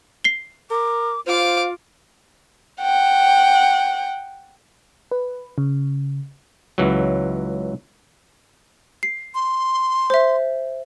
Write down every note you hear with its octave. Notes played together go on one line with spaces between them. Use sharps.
C7 G7
A#4 D6
F4 C5 F5 D6
F#5 G5
B4
C#3
C#2 E3 F#3
C7
C6
C5 E5